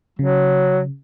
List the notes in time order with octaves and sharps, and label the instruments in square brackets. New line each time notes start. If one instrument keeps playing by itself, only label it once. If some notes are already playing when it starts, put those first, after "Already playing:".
[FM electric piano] C#3 [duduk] F#3